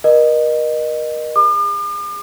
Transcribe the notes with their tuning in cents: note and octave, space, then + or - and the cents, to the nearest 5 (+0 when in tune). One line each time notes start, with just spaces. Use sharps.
A#4 +35 D#5 -25
G#4 -35 D6 +45